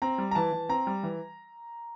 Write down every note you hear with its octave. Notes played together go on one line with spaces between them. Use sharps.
C4 A#5
G3
A#5
E3 A5
E3
C4 A#5
G3
E3